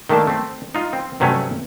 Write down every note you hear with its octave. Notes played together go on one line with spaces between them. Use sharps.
D#3 A3 A#3 D4 A5
A3 C4
D#4 F4
C4
G2 C3 F#3 A3 C#4